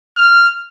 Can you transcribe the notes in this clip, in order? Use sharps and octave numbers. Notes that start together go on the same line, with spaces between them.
F6